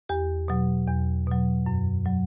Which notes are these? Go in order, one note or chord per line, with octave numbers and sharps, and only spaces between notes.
E2 G4
B2 F#3
E2
B2 F#3
F#2
F#3